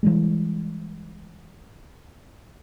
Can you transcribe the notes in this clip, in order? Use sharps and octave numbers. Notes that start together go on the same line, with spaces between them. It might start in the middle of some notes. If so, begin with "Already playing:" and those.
E3 G3 G#3